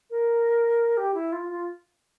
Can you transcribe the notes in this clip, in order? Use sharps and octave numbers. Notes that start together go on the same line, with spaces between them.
A#4
G4
E4
F4
F4